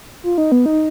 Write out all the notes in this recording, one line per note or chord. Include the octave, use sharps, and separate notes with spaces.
F4
D#4
B3
D#4